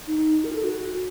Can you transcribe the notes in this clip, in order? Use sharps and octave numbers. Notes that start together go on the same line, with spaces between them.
D#4
A#4
A4
F#4